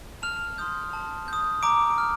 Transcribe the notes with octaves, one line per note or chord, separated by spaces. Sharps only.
A5 F6 F7
C6 D#6 G6
A5
D#6 G6
A#5 D6 D7
F6